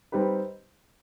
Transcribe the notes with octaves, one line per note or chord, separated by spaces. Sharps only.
G3 C4 D#4 G4 B4